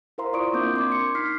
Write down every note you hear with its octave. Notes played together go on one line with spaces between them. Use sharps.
E4 A#4 C5 F5 A#5 C6
F4 D5 C#6 D#6 D7
A#3 C4 D4 A#4 D6 G6
C6 D6 G#6
C#7
D#4 F6 B6 C7